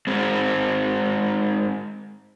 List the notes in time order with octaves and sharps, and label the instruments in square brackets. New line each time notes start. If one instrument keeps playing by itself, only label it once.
[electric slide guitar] G#2 G#3 C4